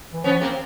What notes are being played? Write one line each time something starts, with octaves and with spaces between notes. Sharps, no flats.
E3
F3 B3 C#4
A#3 C4